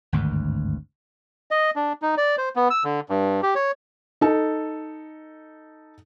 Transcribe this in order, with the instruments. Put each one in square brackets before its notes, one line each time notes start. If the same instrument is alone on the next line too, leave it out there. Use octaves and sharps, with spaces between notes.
[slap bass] G#1 D2 G2
[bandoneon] D#5
D4
D#4
D5
C5
B3
E6
D3
G2
G4
C#5
[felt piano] D#4 A4